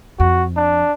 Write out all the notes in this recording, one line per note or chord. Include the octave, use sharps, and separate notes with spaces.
F2 F#4
D4